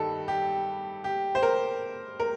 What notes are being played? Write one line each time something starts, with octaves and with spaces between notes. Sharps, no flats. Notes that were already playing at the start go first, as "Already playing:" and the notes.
Already playing: G2 D#3 G3 A4
G4
G4
C5
A#4
A#4